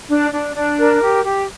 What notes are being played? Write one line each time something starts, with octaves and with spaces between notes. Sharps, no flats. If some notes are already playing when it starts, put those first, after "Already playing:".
D4
D4
D4
A#4
G4
G4